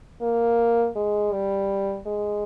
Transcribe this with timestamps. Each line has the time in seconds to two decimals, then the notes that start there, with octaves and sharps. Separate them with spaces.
0.21 A#3
0.95 G#3
1.32 G3
2.07 G#3